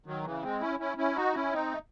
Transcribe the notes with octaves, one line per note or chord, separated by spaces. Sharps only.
D#3 F#3
C#3 E3
G#3 C4
C#4 E4
C#4 E4
C#4 E4
D#4 F#4
C#4 E4
C4 D#4
A3